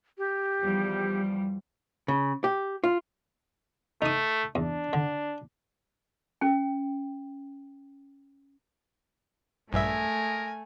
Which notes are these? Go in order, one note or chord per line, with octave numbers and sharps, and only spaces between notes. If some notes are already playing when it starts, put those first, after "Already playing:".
G4
E2 F3 G3
C#3
G4
F4
A3 D#4 D#6
E2 D4
D3
C#4 G5
A#1 G2 G#3 A3 A#4 E5 G#5